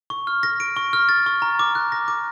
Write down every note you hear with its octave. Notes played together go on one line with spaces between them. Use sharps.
C#6
F6
A#6
D7
C#6
F6
A6
C#6
A#5
D6
F#6
A#6
D6